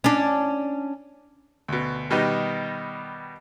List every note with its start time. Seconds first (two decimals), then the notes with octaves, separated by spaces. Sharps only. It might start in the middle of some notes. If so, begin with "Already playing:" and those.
0.04 C#4 D4
1.68 D2 B2
2.10 B2 D#3 G3 D#4